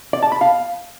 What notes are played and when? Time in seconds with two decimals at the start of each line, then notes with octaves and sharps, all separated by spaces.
0.13 D5
0.23 A5
0.32 B5
0.41 F5